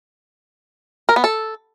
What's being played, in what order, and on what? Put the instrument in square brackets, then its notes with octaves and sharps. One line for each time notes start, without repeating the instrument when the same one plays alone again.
[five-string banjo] A#4
B3
A4